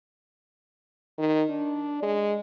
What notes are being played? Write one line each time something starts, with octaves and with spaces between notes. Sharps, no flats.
D#3
D4
G#3